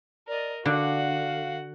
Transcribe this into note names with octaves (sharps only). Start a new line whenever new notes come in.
A#4 D5 D#5
D3 F#4 F5 F#5